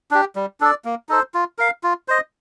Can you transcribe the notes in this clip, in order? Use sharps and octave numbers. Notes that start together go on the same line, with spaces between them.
D4 G4
G3
D4 A4 D5
A#3
D#4 A4 C5
F4
A#4 F5
F4
C5 D#5